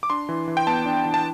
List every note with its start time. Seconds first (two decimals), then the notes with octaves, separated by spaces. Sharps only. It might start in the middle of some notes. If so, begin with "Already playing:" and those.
0.03 D6
0.10 D4 C6
0.29 E3
0.48 E3
0.57 G5
0.67 B3 A5
0.86 D4
1.05 E3
1.14 A5